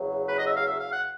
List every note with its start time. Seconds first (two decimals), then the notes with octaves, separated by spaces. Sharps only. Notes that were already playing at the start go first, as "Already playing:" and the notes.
Already playing: E2 C#3 F#3
0.28 B4
0.38 D#5
0.46 E5
0.56 F5
0.66 E5
0.79 F5
0.91 F#5